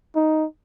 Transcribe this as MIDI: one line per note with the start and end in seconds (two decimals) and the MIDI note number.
0.16 0.46 63